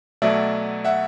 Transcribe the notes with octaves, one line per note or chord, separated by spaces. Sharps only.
B2 F#3 A3 D5 E5
E5 F#5